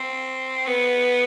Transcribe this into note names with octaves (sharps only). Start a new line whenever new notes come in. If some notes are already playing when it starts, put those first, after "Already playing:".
Already playing: C4
B3